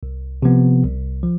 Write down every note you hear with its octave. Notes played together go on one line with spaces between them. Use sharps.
C2
C3 F3 B3
C2
F3